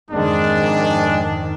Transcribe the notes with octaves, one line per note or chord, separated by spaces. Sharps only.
F2 G#2 D#3 G#3 D4